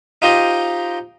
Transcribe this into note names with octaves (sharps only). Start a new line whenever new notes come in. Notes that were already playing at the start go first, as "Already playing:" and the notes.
D#4 F4 G4 C5 D#5